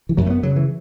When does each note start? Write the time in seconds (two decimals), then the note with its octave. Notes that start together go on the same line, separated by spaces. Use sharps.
0.09 E3
0.17 F#2 F#3
0.26 A3
0.30 B3
0.43 C#3 F#3
0.56 E3